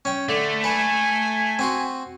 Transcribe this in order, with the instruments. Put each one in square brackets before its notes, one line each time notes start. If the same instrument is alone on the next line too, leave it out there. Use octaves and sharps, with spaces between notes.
[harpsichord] C#4 G5
[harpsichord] D3 [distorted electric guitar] A3
[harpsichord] B4 [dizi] G#5
[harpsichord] C4 F#4 C6